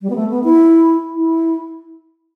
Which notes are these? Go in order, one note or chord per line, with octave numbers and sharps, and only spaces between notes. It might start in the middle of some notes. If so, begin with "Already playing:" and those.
G3
B3
A3
B3
E4
E4